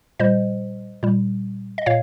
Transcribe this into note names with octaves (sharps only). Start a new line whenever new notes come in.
A#2 G3 C5 D#5
A#2 G3
D#5
A#2 C#5 F5